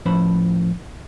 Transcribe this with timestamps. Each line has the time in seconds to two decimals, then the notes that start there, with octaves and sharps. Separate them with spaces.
0.06 A2 F3 C#4 B4 C5 B5